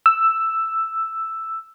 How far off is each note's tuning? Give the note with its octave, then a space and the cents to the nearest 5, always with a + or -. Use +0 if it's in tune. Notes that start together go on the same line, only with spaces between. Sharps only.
E6 +5